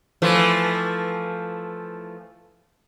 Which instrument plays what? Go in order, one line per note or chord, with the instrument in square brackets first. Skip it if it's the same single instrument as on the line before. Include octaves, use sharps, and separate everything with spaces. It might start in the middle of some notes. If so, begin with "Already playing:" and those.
[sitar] E3 F3 A3